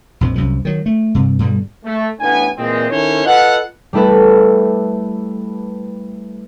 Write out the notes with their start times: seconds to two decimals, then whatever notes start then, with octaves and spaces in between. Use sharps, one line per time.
0.21 A#1 F2 F3
0.36 C2 F#2 F3
0.65 D#3 F#3
0.86 A3
1.15 G2 C3
1.39 G2 B2 D3 G3
1.85 A3
2.20 A1 A2 B3 D4 G#5
2.57 A#2 E3 G#3 C4
2.90 D#3 C#4 E4 A4 C5 C#5
3.25 F4 A4 B4 D#5 F5 F#5
3.93 G3 A3 E4 A4 B4